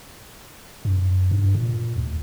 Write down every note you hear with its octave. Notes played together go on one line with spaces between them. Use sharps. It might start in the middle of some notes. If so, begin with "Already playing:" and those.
F#2
G2
A#2
D2